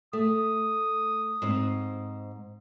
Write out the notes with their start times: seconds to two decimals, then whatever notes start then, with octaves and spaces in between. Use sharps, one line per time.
0.13 A3 D#6
1.42 G#2 C4